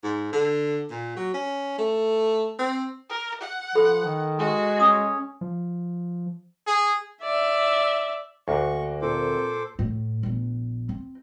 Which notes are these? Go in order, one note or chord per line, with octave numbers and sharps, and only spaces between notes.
G#2
D3
A#2
F#3
C#4
A3
C4
A#4
F#5
F3 A4 B5
D#3
G#3 F#4
C#4 D#6
F3
G#4
D5 E5
D2 A#3 F#4 C#6
A#2 C4 A4 A#4 C5 D6
A2
A#1 B3
C4